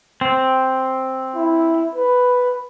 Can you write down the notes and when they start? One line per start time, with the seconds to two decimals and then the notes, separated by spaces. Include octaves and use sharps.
0.21 C4
1.35 E4
1.95 B4